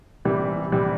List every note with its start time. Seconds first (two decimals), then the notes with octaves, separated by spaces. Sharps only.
0.25 C3 E3 G3
0.72 C3 E3 G3